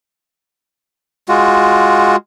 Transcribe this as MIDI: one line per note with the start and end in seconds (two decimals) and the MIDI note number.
1.29 2.16 56
1.29 2.16 65
1.29 2.16 66